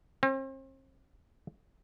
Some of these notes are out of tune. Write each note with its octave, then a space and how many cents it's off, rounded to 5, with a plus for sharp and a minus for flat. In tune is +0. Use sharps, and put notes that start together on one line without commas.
C4 +40